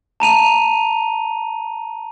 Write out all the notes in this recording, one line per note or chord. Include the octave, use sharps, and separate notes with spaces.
A5 A#5 D#7 F7